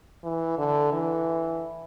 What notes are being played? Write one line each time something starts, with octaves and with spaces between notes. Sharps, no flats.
E3
D3
E3